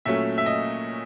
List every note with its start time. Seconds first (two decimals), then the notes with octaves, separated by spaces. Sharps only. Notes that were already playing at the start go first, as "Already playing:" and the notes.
0.05 A#2 F#3 A3 C#4 E5
0.38 E5
0.46 D#5